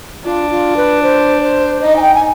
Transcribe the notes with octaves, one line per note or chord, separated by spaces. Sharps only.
D4 F4
F4
B4
C5
C5
D#4 D#5
G#5
G5
G#5